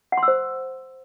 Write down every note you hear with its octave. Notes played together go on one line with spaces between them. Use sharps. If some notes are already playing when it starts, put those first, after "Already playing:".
F#5
C6
E6
C5